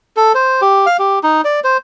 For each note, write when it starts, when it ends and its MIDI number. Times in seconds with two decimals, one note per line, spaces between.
0.17 0.32 69
0.35 0.61 72
0.61 0.86 67
0.86 0.97 77
0.99 1.19 67
1.23 1.41 63
1.44 1.60 74
1.64 1.77 72